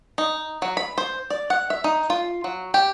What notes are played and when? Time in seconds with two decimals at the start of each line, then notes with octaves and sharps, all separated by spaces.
0.18 D#4
0.62 F#3
0.77 B5
0.98 C5
1.30 D5
1.50 F#5
1.70 E5
1.84 D#4
2.10 F4
2.44 F#3
2.74 G4